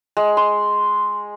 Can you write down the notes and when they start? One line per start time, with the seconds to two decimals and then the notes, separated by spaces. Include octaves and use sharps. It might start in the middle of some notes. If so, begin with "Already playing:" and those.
0.17 G#3
0.37 C6